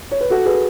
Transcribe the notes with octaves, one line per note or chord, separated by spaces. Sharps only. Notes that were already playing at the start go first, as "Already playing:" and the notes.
C#5
B4
F#4 A4
G#4 B4